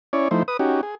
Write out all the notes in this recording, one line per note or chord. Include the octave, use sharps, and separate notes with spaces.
C#4 E4 C#5 D5
F3 A3 D#4 E4 C5
B4 D#6
C#4 D#4 F#4 G4
G#4